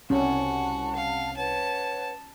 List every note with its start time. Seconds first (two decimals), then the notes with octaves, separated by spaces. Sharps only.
0.10 C2 C#4 F#4 F#5 A5
0.95 F5
1.37 B4 C#5 F#5 A5